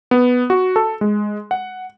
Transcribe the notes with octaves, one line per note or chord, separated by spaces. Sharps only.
B3
F#4
A4
G#3
F#5